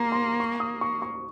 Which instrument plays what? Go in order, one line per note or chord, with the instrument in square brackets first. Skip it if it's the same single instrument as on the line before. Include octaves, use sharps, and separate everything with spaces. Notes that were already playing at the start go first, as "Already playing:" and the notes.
Already playing: [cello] A#3 [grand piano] A#5 C6
[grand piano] C6
C#6
D#6
C#6
C#6